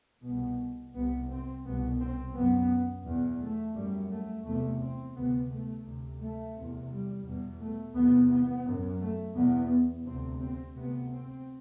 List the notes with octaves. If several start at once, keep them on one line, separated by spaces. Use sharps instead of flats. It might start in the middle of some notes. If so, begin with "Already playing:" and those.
C2 B2 B3
C2 C3 B3
C4
C2 B2 B3
C4
F#2 B3
E2 B2
A3
F#2 G3
A3
E2 C3 A3
C4
D2 C3 B3
A3
D2 C3
A3
E2 C3
G3
E2 B2
A3
E2 C3 B3
B3
F#2
A3
E2 B2 B3
D2 C3 C4
C4
D2 C3 B3
C4